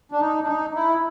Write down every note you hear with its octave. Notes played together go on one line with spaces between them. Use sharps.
D4
D#4
D4
D#4
E4